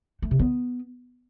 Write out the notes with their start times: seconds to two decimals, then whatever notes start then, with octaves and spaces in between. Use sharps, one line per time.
0.22 A3
0.31 C3
0.39 B3